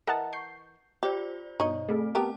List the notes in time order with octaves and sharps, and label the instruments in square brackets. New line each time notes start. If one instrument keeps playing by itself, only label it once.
[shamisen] E3 A#4 [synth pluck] D#5 F#5 A5
[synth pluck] C#6 G6 C7
[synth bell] F4 C5 D5 [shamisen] G4
[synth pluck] G2 B2 [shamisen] D#4 C#5 D#5
[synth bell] A3 C4 [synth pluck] G#4 A4
[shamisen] B3 G4 A#4 [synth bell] A5